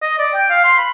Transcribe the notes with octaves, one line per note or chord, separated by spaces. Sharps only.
D#5
D5
G5
F5
C6
B5